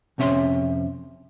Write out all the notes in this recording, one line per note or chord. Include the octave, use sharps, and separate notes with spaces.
F2 C3 C#4 E5 C6